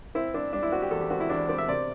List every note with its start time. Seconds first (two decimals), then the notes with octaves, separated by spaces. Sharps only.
0.15 C4 E4
0.34 C4 D4
0.53 G3 D4
0.63 E4
0.72 C4 F#4
0.82 G4
0.91 E2 A4
1.01 G4
1.10 C4 F#4
1.20 E4
1.30 E2 D4
1.49 C4 D5
1.58 E5
1.69 C3 D5